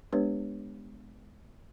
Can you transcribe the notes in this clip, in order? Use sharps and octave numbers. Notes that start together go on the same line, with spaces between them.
G#3 B3 D4 G4 B4 C#5